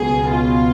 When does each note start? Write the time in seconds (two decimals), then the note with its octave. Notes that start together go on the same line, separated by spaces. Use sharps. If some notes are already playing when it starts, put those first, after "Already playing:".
Already playing: C#2 B2 F#3 G#4
0.30 F4